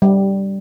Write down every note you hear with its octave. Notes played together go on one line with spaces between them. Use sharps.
G3